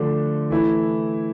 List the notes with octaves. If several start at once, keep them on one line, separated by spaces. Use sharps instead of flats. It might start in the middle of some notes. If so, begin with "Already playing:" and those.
Already playing: D3 F3 A3 D4
E3 A3 E4